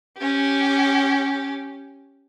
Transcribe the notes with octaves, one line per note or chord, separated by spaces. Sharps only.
C#4 G4